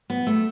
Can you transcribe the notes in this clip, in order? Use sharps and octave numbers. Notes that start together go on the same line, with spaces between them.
B3
A3